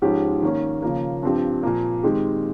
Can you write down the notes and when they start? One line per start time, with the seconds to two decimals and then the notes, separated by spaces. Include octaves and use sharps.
0.02 G#2 F3 G#3 C#4 G4
0.42 D#3 A#3 C#4
0.82 C#3 F3 A#3
1.23 G2 F3 C4 G4
1.63 A#2 F3 A#3
2.03 D#3 G#3 C4 G4